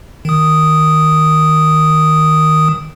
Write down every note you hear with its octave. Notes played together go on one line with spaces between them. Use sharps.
D#3 D#6